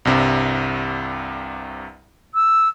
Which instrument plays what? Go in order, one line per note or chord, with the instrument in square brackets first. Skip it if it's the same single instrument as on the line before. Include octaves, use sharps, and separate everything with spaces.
[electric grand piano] C2 G2 C3
[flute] E6